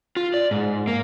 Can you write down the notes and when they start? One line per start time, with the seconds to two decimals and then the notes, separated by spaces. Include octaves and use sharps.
0.16 F4
0.34 D5
0.51 G#2
0.87 A#3